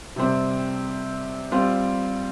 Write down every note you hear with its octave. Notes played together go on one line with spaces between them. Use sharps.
C3 G3 C4
G3 C4 F4